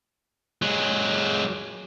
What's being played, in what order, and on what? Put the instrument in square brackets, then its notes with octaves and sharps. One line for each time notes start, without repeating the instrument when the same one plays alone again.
[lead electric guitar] F#3 G#3